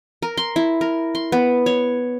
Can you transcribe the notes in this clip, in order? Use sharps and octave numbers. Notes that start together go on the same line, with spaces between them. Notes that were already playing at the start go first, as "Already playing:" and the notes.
A#4
C6
E4
A#4
C6
B3
C#5